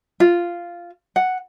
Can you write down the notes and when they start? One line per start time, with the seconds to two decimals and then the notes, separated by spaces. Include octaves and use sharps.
0.20 F4
1.16 F#5